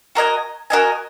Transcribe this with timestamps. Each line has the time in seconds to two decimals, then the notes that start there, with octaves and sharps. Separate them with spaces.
0.15 F#4 A#4 D#5 G#5
0.70 F#4 A#4 D#5 G#5